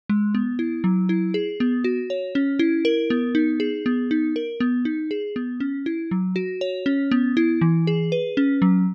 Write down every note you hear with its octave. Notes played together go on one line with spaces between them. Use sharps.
G#3
B3
E4
F#3
E4
G#4
B3
F#4
C#5
C#4
E4
A#4
B3
D#4
G#4
B3
D#4
A#4
B3
D#4
G#4
B3
C#4
E4
F#3
F#4
C#5
C#4
B3
E4
E3
G#4
B4
C#4
F#3